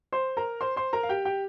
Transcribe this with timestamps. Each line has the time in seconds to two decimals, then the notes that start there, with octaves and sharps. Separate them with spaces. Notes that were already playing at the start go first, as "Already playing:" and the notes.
0.12 C5 C6
0.37 A#4 A#5
0.61 C5 C6
0.76 C5 C6
0.93 A#4 A#5
1.03 F5
1.09 G4 G5
1.25 G4 G5